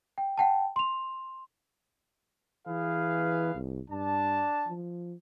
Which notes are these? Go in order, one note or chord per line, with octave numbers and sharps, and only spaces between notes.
G5
F#5 G5 A5
C6 F7
E3 G#4 B4 F5
C2
G2 D4 A5
F3